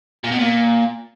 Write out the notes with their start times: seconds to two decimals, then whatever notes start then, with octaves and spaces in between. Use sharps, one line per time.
0.24 A#2
0.32 B2
0.39 A#2